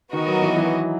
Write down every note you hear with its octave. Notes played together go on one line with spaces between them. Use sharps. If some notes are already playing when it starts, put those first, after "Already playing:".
D#3 B3 F#4 A#4 D#5
F#3
E3
E3